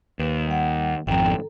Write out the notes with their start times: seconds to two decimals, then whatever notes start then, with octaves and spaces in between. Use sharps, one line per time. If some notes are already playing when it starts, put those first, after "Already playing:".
0.19 D#2 B4
0.47 G3 F#5
1.07 G#1 F2 G5 A#5
1.27 A4